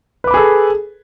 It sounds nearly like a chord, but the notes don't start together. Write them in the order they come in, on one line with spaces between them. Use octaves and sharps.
B4 D6 B5 G#4 A4